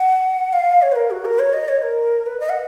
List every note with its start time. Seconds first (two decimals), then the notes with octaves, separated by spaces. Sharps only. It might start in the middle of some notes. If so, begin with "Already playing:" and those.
Already playing: F#5
0.53 F5
0.82 C#5
0.92 B4
0.96 A#4
1.11 F#4
1.25 A#4
1.39 C#5
1.53 D#5
1.68 C#5
1.82 A#4
2.26 B4
2.40 D#5
2.49 F#5